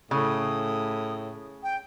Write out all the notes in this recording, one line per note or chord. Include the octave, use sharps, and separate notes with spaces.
A2 C#3 D#6
G5